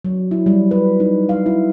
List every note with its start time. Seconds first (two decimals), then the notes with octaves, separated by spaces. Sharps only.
0.05 F#3
0.31 E4
0.46 G3
0.71 B4
1.00 D#4
1.29 F5
1.46 E4